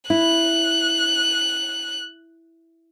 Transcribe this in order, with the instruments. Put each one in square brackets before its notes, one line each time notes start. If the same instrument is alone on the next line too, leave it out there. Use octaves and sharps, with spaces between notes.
[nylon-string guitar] E4 [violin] F#6